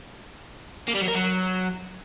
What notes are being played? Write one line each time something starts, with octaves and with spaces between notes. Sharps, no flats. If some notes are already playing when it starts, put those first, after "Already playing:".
A#3
G3
F#3
A#4
F#3